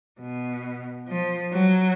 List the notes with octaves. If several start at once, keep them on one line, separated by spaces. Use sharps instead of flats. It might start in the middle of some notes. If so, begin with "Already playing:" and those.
B2
F3
F#3